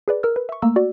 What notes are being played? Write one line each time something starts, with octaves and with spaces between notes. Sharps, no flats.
G#4 B4 D5
A#4 E6 F6
B4
E5 C#6
A3 A#3 A#5 E6
F#4 D5